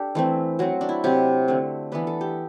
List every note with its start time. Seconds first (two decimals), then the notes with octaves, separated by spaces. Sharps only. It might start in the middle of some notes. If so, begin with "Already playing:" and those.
Already playing: D4 G4 A4
0.15 E3 A3 C4
0.59 F#3 C4 F#4
0.81 D4
0.89 E4
1.04 C3 F#3 C4 G4
1.48 D3 A3 C4
1.92 E3 B3 D4 B4
2.07 A4
2.21 G4